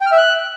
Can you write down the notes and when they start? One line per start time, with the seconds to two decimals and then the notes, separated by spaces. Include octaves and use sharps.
0.01 G5
0.06 F6
0.12 E5
0.18 F#6